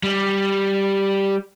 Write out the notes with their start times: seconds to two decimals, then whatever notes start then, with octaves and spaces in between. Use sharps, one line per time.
0.03 G3